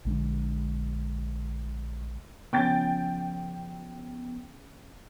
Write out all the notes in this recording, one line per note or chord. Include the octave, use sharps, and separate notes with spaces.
A#1 D3 G#3 D4
C#3 F3 B3 G5 G6 A6